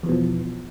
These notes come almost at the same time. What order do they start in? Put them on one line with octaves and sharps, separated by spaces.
E2 E3 B2 F3